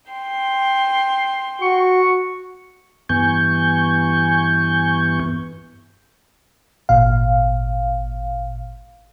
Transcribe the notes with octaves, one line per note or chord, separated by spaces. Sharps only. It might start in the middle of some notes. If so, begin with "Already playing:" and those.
G5 C6
F#4 C#6
G2 E3 B3 G#5 C#6 G6
G#1 A#2 F5